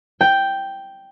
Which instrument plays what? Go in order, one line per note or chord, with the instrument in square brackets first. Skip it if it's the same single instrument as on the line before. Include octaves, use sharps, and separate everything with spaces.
[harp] G5